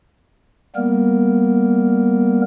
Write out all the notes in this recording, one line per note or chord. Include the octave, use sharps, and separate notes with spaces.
G3 A#3 B3 A#4